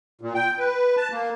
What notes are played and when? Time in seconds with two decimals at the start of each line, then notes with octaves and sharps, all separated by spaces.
0.21 A#2
0.35 G5
0.59 B4
0.97 A5
1.12 A#3